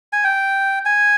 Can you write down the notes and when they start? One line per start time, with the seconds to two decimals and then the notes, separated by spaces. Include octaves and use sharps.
0.13 G#5
0.24 G5
0.85 G#5